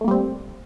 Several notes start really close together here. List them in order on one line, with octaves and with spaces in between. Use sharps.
A3 A#3 G3 C4